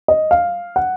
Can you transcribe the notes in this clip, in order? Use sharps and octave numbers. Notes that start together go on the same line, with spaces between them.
D#5
F5
F#5